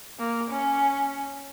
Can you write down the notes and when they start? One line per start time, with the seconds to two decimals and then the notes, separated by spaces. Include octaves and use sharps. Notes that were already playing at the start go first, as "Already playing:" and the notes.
0.19 A#3
0.50 C#4